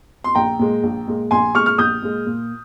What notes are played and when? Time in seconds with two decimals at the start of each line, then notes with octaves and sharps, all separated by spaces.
0.24 C6
0.35 A#1 G5 A#5
0.59 A#2 G#3
0.83 A#1
1.07 A#2 G#3
1.31 A#1 G#5 C6
1.55 A#2 G#3 C#6 F6
1.66 F6
1.78 A#1 D#6 G6
2.02 A#2 G#3
2.26 A#2